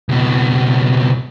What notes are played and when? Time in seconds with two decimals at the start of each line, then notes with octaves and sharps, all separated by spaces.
0.09 C#2 B2